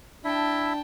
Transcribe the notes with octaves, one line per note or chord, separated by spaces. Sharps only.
D4 E4 E5 G5 A5